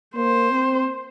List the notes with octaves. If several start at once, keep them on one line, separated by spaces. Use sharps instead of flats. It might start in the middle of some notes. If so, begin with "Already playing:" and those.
A#3 C5
C4